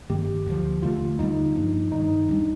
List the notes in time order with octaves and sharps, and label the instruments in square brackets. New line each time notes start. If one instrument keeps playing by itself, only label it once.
[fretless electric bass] G2 D#3 A#3 [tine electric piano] G4
[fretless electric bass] D2 D3 F3
[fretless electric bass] D#2 D3 A3 [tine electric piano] F4
[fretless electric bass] D#2 D3 G3 A#3 [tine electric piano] D#4
[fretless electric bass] G2 F3 A#3 D4
[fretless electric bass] G2 D#3 G3 [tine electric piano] D#4
[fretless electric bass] D#2 D#3 G3 D4